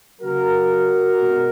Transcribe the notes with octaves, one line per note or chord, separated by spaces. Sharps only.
C#3 F#3 A#3 F#4 A#4
B2 G#3